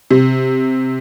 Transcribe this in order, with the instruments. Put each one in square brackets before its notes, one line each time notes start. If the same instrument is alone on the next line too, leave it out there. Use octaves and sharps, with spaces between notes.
[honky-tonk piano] C3